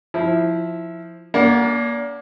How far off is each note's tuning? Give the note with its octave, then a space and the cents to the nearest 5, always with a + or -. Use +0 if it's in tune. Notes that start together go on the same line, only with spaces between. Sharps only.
F3 +0 E4 +0
A#3 +20 D4 -35 F#5 +0